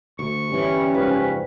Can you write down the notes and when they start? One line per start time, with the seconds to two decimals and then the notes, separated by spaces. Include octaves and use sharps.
0.19 D2 C#6
0.50 G1 E3 G3 C#4
0.94 F#1 G#2 F3 B4